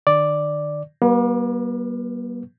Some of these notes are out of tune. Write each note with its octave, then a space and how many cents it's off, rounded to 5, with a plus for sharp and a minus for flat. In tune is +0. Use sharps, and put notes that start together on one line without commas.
D#3 -45 D5 +0
G3 -40 A#3 +45 B4 +0